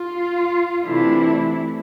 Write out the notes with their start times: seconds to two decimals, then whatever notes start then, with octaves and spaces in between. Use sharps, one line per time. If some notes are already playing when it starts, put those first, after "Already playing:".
Already playing: F4
0.84 C3 E3 A3 D4 E4